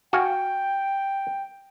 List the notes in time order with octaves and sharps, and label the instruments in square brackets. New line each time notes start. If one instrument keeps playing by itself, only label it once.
[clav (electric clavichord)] F#4 F5 G#5 [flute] G5